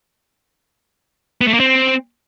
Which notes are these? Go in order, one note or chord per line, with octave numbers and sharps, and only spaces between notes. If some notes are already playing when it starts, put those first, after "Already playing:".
B3
A3
A#3
C4